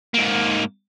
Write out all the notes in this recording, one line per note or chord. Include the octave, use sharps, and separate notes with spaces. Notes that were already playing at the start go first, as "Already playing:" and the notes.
G#2 A#3